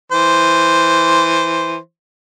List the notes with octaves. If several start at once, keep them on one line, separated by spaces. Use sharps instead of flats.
E3 C5